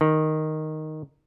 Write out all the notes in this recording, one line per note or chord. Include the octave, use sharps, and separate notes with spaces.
D#3